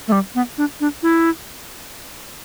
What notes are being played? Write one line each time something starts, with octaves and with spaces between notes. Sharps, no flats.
A3
G3
B3
D4
D4
E4